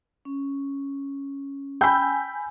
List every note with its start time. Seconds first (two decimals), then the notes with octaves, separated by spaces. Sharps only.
0.25 C#4
1.81 G5 G#5 B5 E6 G6